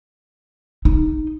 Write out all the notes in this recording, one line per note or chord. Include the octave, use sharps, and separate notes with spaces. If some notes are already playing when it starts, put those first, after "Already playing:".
D#4